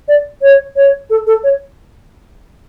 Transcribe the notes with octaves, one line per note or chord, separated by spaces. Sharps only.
D5
C#5
C#5
A4
A4
C#5